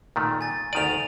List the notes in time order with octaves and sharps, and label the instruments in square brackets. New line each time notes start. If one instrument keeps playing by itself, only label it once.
[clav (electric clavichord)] A#2 D#3 A3
[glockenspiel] G#5 A6
[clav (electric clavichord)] D2 D#3 D5 [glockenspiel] D#7 F7